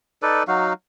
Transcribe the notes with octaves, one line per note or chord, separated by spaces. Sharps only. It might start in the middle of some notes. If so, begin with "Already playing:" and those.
D#4 A4 B4 D5
F#3 D#4 F#4 F5